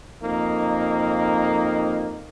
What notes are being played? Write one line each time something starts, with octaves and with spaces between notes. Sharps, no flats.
F2 A#3 D#4